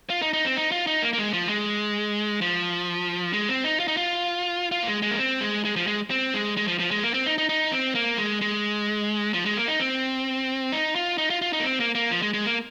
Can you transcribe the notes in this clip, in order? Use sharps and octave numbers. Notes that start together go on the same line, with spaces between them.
F4
D#4
D#4
C4
D#4
F4
D#4
A#3
A#3
G#3
F3
G#3
F3
G#3
C4
D#4
F4
D#4
F4
F4
A#3
G#3
G#3
A#3
C4
G#3
G#3
F3
G#3
C4
G#3
G#3
F3
F3
G#3
A#3
C4
D#4
D#4
D#4
C4
A#3
G#3
G#3
F3
G#3
A#3
D#4
C4
D#4
F4
D#4
F4
F4
D#4
A#3
C4
A#3
A#3
F3
G#3
G#3
A#3